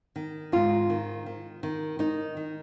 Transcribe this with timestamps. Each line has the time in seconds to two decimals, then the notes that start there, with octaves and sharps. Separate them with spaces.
0.16 D#3
0.52 G#2 F4
0.90 D#3
1.26 D#3
1.63 D#3
1.99 D#3 D#4
2.37 D#3